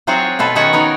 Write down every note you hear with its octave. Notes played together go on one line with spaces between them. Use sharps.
F#3 C4 F4 F#4 G#4 C#5
B2 F4 A4 B4
D#3 C#4 D#4 F#4 C#5 F#5
B3 D#4 A#4